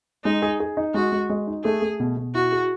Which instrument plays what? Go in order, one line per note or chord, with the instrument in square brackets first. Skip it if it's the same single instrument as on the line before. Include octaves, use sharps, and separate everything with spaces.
[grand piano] G#3 [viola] D#4
[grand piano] G#4
G#4
D#4
[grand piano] G#3 [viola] F#4
[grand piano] G#3
G#3
D#4
[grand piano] A3 [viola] G#4
[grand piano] A3
B2
B2
[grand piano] E4 [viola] F#4
[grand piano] G#4